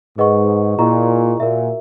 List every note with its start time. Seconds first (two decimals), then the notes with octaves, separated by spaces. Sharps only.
0.17 G#2 G#4 B4 D#5 F#5 C#6
0.78 A#2 E4 G#4 D#5 A#5 C#6
1.39 A#2 F#4 A#4 E5